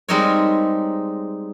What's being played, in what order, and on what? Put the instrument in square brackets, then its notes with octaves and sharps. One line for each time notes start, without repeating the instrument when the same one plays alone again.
[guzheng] G3 G#3 C4 D#4 A#4 C#5